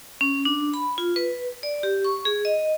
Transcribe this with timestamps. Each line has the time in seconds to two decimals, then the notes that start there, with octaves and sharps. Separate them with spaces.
0.21 C#4
0.45 D4
0.74 B5
0.98 F4
1.16 B4
1.63 D5
1.83 G4
2.04 C#6
2.25 G#4
2.45 D#5